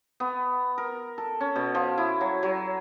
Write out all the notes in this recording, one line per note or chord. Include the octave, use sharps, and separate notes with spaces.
B3
A#4
A4
C#4
B2
F3
E4
F#3
F#3